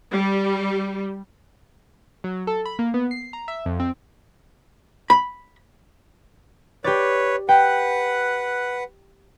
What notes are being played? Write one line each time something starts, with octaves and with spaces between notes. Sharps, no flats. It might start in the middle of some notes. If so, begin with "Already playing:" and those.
G3
F#3
A4
B5
A#3
B3
C7
A#5
E5
F2
C4
B5
G4 B4 C#5 D5
B4 F#5 G5